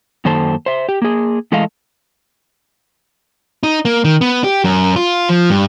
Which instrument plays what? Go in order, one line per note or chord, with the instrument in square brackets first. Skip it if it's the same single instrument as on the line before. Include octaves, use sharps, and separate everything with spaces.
[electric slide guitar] F#2 D#3 A#3 A4 C5 A5
C5 E5
G4
A#3 G#4
E3 G#3 A3 A4 D#5 F5
[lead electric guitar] D#4
A#3
D#3
B3
G4
F#2
F4
F3
G2